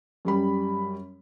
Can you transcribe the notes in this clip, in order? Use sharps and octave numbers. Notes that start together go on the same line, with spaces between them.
F#2 G3 B5